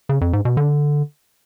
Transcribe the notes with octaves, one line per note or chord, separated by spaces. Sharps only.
C#3
F2
G#2
B2
D3